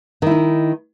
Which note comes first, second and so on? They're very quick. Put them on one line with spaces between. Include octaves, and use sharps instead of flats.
D#3 E4 D#4